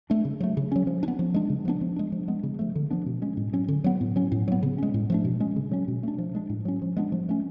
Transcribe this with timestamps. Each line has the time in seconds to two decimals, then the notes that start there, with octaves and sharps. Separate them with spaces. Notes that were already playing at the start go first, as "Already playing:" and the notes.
0.10 A3 D4
0.25 C#3
0.40 F#3 A3
0.57 C#3
0.72 F#3 C#4
0.87 F3
1.03 D4
1.08 B3
1.19 F3
1.34 G#3 D4
1.50 C#3
1.65 F3 B3 D4
1.81 F3
1.96 G#3 D4
2.12 F3
2.28 G#3 B3
2.43 C#3
2.59 F3 A3
2.75 D3
2.91 F3 B3 D4
3.06 B2
3.22 G#3 C#4
3.37 A2
3.53 F#3 C#4
3.68 D3
3.84 F#3 B3
4.01 A2
4.16 F#3 C#4
4.32 A2
4.48 F#3 B3
4.63 C#3
4.78 G#3 C#4
4.94 A2
5.10 F3 A3 D4
5.25 B2
5.40 G#3 C#4
5.56 C#3
5.71 F#3 C#4
5.88 B2
6.03 A3 D4
6.18 F3
6.35 G#3 D4
6.50 A2
6.65 F#3 C#4
6.82 F3
6.97 G#3 B3 D4
7.12 F3
7.29 A3 C#4